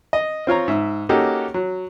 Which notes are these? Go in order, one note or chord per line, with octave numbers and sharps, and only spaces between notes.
D#5
C4 F4 C#5 A#5
G#2 E5
A#3 C#4 D#4 F#4 G4 A4
F#3